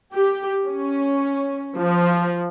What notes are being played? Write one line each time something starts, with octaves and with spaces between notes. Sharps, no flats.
G4
C#4
F3